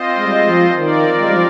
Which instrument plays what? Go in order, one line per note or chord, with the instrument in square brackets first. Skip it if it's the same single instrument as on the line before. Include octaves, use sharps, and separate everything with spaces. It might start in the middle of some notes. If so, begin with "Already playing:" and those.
Already playing: [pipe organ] C4 F4 C5 D#5
[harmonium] G#3
G3
G#3
F3
[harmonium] D#3 [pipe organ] C4 F4 A#4 D5
[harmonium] G#3
G3
F3